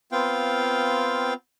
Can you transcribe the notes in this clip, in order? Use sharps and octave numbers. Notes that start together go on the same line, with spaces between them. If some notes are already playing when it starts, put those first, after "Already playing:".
B3 C4 F4 F5 G5